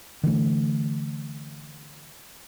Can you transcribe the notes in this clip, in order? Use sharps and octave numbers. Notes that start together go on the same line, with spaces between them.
D3 E3 G3 A3